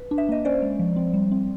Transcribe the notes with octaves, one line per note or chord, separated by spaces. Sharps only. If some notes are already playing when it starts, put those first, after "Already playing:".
Already playing: B4
D4
E5
A#3 D#5
C#4 C5 D5
G#3
F3
C4
G3
C4